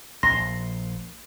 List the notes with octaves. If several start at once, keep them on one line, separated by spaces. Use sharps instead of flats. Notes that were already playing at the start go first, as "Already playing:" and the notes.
A#1 C6 A#6